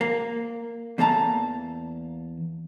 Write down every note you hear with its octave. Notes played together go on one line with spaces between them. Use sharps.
A#3
E2 A#3 A4 A5 A#5